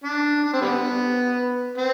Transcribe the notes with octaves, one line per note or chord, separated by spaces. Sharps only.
D4
D4
C4
D3 G3 B3
C4